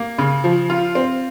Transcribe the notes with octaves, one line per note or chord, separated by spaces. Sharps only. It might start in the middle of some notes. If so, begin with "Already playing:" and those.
Already playing: A#3
C#3
F3
F4
C4